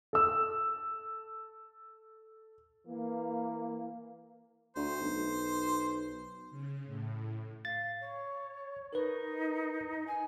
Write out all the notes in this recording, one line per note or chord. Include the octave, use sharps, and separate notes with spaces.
A4 E6
E3 A#3
D2 C5
B1
C#3
A2
F5 A6
C#5
D#4 A#4 B4
G#5